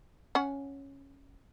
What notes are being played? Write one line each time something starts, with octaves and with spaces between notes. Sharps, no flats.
C#4 F#5